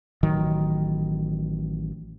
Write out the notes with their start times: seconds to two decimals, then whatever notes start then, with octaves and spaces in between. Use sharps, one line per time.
0.23 A1 D#3 F#3